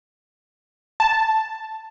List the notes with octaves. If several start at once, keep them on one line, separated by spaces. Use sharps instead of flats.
A5